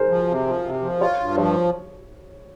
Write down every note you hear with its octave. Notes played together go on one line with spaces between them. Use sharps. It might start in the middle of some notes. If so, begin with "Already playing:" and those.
Already playing: G#4 A#4 C5
F3
C3
F3
C3
F3
F4 C#5
G2
F3 C#5